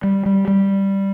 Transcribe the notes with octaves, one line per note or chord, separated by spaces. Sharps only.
G3
G3
G3